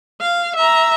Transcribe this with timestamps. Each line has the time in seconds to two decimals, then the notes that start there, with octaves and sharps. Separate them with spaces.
0.21 F5
0.56 E5 A#5